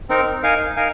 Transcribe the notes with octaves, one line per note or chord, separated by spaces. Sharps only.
C4 D#4 A#4
D#4 A#4 F5 G#5
D#4 A#4 F5 G#5